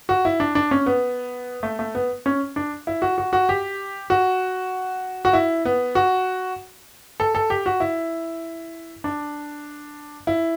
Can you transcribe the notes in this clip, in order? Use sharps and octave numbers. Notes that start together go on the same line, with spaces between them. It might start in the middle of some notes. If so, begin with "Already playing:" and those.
F#4
E4
D4
D4
C#4
B3
A3
A3
B3
C#4
D4
E4
F#4
F#4
F#4
G4
F#4
F#4
E4
B3
F#4
A4
A4
G4
F#4
E4
D4
E4